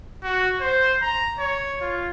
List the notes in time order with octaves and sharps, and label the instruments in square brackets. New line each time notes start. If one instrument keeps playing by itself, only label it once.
[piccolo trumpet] F#4
C5
A#5
C#5
F4